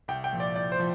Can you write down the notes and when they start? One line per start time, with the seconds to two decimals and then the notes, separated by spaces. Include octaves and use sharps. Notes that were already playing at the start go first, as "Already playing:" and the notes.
0.08 C2 G5
0.24 G5
0.32 A#2 F3
0.40 D5
0.56 C2 D5
0.72 C5
0.80 F3